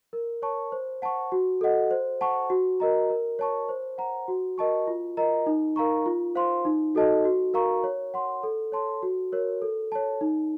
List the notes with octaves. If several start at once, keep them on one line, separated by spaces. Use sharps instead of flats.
A#4
C#5 A5 C#6
C5
F#5 A5 C#6
F#4
A4 D#5 F#5
C5
F#5 A5 C#6
F#4
A#4 D#5 A#5
A#4
C#5 A5 C#6
C5
F#5 A#5
F#4
A#4 D#5 A5 C#6
F4
A#4 D#5 A#5
D#4
A#4 F5 A#5 C#6
F4
C5 F5 C6
D#4
F#4 A4 D#5 A5
F#4
A#4 F5 A#5 C#6
C#5
F#5 C6
A4
C#5 A5 C6
F#4
A#4 C#5
A4
C#5 A5
D#4